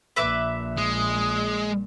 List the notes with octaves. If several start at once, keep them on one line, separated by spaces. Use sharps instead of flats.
A#1 A#2 B4 E5 D6
G#3 D#6